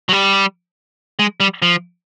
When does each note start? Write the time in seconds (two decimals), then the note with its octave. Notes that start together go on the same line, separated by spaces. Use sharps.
0.09 F#3
0.13 G3
1.19 G#3
1.40 G3
1.62 F3